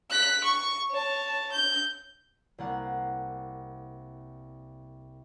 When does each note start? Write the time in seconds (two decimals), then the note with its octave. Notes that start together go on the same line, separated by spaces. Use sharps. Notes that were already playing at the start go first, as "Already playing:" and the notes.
0.11 F#6 B6
0.44 C#6
0.91 C#5 A5
1.52 G6
2.58 C2 A#3 F#5